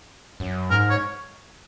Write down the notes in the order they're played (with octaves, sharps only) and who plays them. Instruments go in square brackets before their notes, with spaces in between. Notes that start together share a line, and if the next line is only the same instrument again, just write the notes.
[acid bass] F#2
[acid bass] G#2 [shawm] A#4
[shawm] C#5